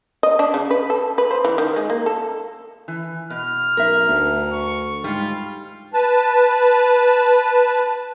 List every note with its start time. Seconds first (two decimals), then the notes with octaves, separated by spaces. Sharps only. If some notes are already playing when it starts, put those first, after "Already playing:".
0.23 D#5
0.39 D4
0.54 C#3
0.71 B4
0.90 A4
1.18 B4
1.31 C5
1.45 E3
1.58 D#3
1.76 G#3
1.90 A#3
2.06 A4
2.88 E3
3.30 B2 F6
3.77 B1 A#4 E5
4.07 D2
4.53 C#6
5.04 G#2 G3 F4
5.94 B4 A5